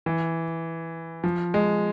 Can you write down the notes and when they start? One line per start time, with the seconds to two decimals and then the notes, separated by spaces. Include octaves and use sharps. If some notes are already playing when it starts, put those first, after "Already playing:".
0.06 E3
1.24 F3
1.54 G#3